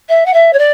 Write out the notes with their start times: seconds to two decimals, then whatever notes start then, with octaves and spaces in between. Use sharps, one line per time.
0.09 E5
0.26 F#5
0.33 E5
0.53 C#5
0.58 D5